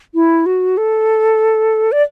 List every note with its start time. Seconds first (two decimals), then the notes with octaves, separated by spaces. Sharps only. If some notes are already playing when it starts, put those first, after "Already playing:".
0.14 E4
0.46 F#4
0.77 A4
1.92 D5